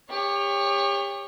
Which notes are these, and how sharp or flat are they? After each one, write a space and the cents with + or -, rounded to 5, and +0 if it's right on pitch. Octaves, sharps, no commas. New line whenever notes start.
G4 +35 C#5 +0